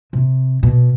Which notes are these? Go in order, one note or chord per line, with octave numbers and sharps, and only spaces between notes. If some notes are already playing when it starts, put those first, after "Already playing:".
C3
B2